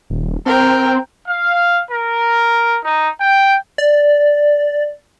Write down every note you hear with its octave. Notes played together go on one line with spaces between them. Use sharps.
D#1
C4 A#4 G5
F5
A#4
D#4
G5
D5